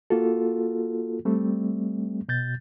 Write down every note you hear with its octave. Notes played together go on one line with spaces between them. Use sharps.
A#3 F4 F#4 A4
G3 A3 C4
B2 G6 A6